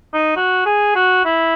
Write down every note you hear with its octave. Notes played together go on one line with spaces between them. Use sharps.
D#4
F#4
G#4
F#4
E4